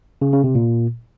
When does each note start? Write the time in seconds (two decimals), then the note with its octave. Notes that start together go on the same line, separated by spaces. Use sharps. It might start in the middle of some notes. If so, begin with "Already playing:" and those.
0.22 C#3
0.33 C#3
0.44 C3
0.55 A#2